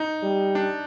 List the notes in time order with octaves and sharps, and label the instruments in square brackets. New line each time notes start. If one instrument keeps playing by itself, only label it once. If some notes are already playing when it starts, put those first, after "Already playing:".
Already playing: [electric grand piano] D#4
[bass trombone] G3
[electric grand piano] D4